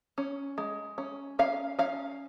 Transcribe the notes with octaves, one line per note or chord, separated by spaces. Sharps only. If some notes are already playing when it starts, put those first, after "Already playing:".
C#4
G#3
C#4
C#4 F5
C#4 F5